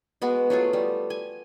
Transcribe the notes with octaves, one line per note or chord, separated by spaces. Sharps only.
G#3 B3 F#4
F#3 A3 F4 G#4
G3
G#5